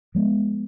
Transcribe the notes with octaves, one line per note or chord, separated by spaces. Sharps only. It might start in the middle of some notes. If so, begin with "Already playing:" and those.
F3 G#3 B3